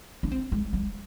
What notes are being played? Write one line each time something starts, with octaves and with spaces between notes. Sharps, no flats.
D4
C4
G#3
G3